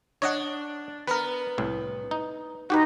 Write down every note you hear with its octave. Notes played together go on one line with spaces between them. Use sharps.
D4 C#5 D#5 F#5
B3 A#4 B4
C2 A2
D#4
D#4 F#4 G4 B4